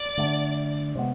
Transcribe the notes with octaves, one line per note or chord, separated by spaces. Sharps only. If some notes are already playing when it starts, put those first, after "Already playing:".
Already playing: D5
D3 A3 D4
C3 G#3 B3